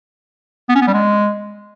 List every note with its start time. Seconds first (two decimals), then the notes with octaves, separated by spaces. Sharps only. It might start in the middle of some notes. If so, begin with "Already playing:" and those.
0.69 B3
0.75 C#4
0.81 B3
0.87 G3
0.94 G#3